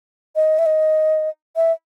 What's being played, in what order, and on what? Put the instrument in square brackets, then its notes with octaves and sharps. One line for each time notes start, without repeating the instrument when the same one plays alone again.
[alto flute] D#5
E5
D#5
E5